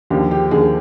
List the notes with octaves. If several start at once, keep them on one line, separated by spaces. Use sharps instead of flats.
D#2 D3 F3 G4
G4
D#2 D3 F3 G#4